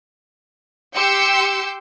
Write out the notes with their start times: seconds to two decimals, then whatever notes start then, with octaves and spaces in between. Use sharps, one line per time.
0.95 G4 G5 C6 E6 G6 C#7